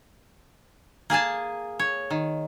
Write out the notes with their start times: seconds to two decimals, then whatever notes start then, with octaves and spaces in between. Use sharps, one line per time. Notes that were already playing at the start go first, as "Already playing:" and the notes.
1.10 A#3 G#4 G#5 A5
1.79 C#5
2.10 D#3